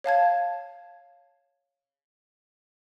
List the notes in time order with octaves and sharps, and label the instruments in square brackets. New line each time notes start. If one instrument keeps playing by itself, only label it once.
[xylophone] C#5 F5 A5 G#6